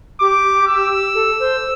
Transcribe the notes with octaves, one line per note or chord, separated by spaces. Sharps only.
G4 D6
E6
A4
C5